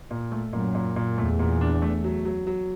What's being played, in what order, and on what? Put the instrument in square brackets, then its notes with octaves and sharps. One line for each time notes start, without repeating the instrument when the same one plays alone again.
[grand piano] A#2
A3
[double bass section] F#2 [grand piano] A#2
[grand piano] A#2
A#2
[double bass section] E2 [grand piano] A3
[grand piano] A#2
D4
A3
F#3
F#3
F#3